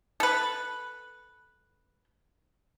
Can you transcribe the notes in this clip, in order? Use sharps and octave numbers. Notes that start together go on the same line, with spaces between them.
A4 B4